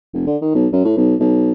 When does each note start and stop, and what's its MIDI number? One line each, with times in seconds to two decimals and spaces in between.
0.13 0.26 29
0.27 0.37 50
0.42 0.52 51
0.55 0.67 35
0.73 0.85 42
0.85 0.96 45
0.97 1.15 35
1.20 1.52 35